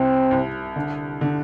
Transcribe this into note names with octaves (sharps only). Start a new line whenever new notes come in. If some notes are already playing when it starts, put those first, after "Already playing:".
Already playing: C2 C3 C4
C2
D3
D3